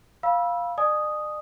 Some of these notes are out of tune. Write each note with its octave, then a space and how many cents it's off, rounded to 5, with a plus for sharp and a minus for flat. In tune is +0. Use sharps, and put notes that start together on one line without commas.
F5 +0 B5 -30 E6 +0
D5 +45 G#5 +20 D#6 +0